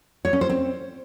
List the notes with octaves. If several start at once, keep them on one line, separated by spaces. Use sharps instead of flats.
C#5
C#4
C5
C4